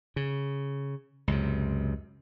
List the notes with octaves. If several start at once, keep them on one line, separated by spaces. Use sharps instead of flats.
C#3
C#2 F#2 C3